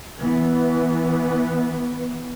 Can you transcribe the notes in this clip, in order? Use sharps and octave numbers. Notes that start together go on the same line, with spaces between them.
E3 B3